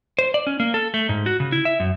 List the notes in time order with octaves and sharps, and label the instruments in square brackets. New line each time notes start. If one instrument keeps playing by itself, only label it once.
[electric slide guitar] C5
D5
C#4
A#3
A4
A3
G#2
F#4
C#3
E4
E5
F#2